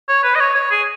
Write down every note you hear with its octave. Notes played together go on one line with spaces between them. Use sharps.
C#5
B4
D#5
C#5
C#5
G#4